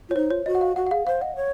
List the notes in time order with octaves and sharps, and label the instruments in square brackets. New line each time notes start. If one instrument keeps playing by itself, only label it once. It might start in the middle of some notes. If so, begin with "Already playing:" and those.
[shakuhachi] F4 [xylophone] C#5
[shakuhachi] D#4 [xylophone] C5
[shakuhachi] F4 [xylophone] C#5
[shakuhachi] F#4 [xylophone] D#5
[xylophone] F#5
F5
[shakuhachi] F#4 [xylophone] F#5
[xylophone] F#5
[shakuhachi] G#4 [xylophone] F5
[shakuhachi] C5 [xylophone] F5
[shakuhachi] D#5 [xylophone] F#5
[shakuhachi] C#5